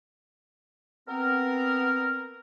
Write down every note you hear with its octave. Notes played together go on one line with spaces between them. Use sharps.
B3 C4 A#4